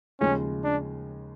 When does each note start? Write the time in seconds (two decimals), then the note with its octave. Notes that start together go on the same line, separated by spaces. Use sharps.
0.20 D#2 C#3 F3 G#3 C#4
0.64 D4